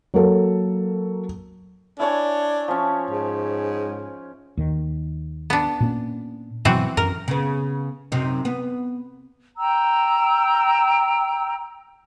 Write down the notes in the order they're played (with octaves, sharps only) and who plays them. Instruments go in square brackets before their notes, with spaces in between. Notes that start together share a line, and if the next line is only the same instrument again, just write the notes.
[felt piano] F#3 A#3 A4
[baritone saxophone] D4 [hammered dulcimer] E4 C#5 G#5
[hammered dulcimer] F3 C#4
[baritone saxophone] G#2
[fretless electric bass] D#2 D#3
[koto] B3 D4
[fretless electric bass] A#2 A#3 C#4
[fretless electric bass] G2 B2 F#3 [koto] E3 C4 F#4
[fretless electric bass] F#2 [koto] A#4
[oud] C#3 B3
F#2 C3 D#4
B3
[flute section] G5 A#5 E6